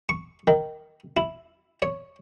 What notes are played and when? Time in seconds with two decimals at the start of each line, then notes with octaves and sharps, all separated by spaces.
0.09 C#6
0.47 D#3
1.17 E4
1.82 C#5